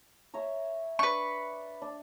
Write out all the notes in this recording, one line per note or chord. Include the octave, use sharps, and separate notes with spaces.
C#5 E5 A#5
D4 B4 C#6
D4